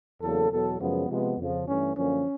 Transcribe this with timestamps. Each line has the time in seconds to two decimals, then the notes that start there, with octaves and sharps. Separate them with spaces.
0.21 E2 C#3 F#3 A#3 A4
0.50 E2 B2 F#3 B3 A4
0.80 F#2 C#3 F3 G#3 B3
1.08 C3 F3 G#3 B3
1.37 F2 C#3 F3
1.65 G2 E3 A3 C#4
1.94 F#2 D3 F3 A#3 C#4